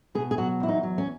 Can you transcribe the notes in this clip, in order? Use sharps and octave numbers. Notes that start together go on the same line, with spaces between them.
B2 G#4
G#4
F#3 F#4
E2 E4
D#4
F#3
C#4